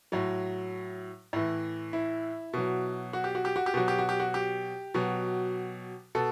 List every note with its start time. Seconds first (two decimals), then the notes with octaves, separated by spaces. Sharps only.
0.12 A2 F#3
1.33 A2 E3
1.93 E4
2.53 B2 F#3
3.13 F#4
3.24 G4
3.35 F#4
3.45 G4
3.56 F#4
3.66 G4
3.74 B2 F#3 F#4
3.88 G4
3.99 F#4
4.09 G4
4.20 F#4
4.34 G4
4.94 B2 F#3
6.15 B2 A4